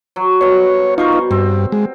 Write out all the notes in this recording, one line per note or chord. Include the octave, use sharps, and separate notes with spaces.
F#3
B2 G3 C#5
D#4 F4 A#4 C5 C#6
B2
G2 C4
G#3